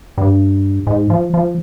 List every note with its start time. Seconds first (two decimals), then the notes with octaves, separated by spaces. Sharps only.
0.18 G2
0.87 G#2
1.10 F3
1.34 F3